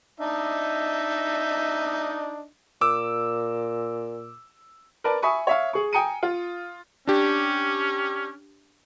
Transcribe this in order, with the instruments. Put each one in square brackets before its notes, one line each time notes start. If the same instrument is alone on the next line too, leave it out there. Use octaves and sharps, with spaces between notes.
[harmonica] D4 D#4 D#5 [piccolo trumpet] E5
[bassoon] A#2 [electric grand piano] D6 E6
[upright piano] A#4 B4 D5 A5
E5 G#5 B5 C#6 D#6
C#5 E5 F5
G#4 C#6
G5 G#5 A#5 D#6 C#7 D#7
F4
[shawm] C#4 [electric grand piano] D4 G4